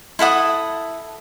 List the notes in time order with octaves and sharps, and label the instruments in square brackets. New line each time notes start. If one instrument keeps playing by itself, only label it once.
[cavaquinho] E4 A4 F#5 D#6